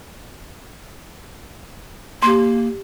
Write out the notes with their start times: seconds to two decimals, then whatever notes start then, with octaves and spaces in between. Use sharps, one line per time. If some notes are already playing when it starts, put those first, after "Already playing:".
2.23 A#3 G4 C6